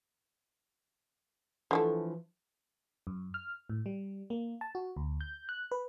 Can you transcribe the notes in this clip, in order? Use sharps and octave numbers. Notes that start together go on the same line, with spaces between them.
D3 E3 F3 G#3 A3
F#2
F6
A2
G3
A#3
A5
F#4
D2
G6
F#6
B4